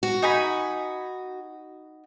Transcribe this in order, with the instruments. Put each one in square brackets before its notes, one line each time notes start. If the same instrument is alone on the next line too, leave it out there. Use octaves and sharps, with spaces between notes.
[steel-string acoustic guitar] F#4
[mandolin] D#4 G#5 B5